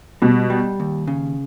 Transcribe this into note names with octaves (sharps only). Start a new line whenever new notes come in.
B2 G3
G3
D#2
C#3